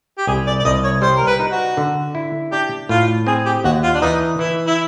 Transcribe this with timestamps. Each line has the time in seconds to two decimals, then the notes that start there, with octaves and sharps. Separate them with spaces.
0.18 G4
0.27 C2 G#4
0.47 D5
0.59 D5
0.65 C2 D#5
0.84 C#5
1.02 G3 C5
1.17 A#4
1.27 B4
1.39 D#4
1.52 F#4
1.77 D3
2.15 E4
2.52 D4 G4
2.89 A2 F4
3.27 C4 G#4
3.46 G4
3.64 D#2 F#4
3.83 F4
3.94 D4
4.02 E3 D#4
4.39 E3 E4
4.67 E4